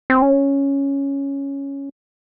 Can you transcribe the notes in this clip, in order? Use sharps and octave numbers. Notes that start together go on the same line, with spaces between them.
C4
C#4